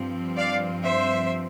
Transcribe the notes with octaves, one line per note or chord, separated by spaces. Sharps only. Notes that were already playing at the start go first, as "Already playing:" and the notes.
Already playing: G2 F3 C4
D5 F5
C5 E5